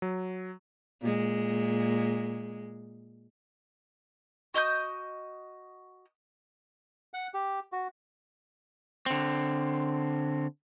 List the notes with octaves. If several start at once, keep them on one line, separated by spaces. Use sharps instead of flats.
F#3
A#2 G#3
F#4 D#5 D#6 G6
F#5
G4
F#4
D3 C4